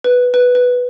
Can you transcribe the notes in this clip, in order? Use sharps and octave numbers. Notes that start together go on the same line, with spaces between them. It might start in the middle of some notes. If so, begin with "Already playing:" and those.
B4
B4
B4